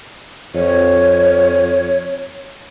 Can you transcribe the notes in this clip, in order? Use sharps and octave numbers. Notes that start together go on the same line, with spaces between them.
F2 C#5